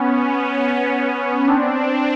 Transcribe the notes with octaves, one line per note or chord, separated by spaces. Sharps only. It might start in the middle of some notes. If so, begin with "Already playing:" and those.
Already playing: B3 C#4
C4 D4